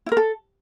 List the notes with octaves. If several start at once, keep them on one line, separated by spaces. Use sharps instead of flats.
E4
A#4
A4